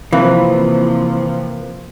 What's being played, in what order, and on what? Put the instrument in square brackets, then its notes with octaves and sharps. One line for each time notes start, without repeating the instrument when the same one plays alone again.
[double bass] C3 F3 [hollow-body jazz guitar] E3 [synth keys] A#3 C4 B4